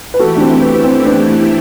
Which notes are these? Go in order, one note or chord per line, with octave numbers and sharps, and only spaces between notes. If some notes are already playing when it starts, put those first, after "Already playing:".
B4
E3 A3 E4 F#4 G4 A4
D4
C4
C4
B3
B3
C4
B3 D4